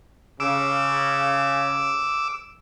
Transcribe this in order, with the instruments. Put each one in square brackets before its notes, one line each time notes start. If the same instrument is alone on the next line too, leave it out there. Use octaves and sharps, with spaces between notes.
[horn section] C#3 [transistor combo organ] D6 E6